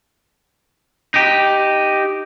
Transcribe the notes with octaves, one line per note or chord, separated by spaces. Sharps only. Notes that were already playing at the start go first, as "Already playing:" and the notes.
D#4 G4